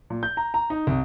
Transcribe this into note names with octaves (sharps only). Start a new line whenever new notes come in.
A#2
G6
A#5
A#5
D#4
C2